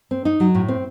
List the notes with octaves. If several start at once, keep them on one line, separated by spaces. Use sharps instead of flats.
C4
D#4
F#3
A2
C4